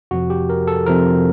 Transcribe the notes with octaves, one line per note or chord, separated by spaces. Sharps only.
F2 C3 F3 F#4
G4
A#4
A4
F2 C3 F3 A#4